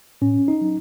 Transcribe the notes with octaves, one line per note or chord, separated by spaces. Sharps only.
A2 C#4
D#4
F#3